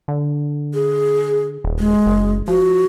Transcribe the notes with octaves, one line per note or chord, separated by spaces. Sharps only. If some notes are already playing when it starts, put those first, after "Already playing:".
D3
G#4
D#1
G#3
F#1
F3 F#4